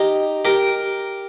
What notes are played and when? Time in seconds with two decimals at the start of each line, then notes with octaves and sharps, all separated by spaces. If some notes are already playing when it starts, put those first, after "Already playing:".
Already playing: D#4 G4
0.45 G4 A#4